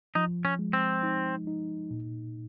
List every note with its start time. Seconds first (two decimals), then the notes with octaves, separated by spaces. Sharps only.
0.15 F3 D#4
0.45 C#4
0.59 G#3
0.73 C4
1.03 D#4
1.47 D#4
1.91 A#2